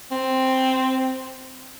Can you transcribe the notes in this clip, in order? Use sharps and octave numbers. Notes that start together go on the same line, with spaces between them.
C4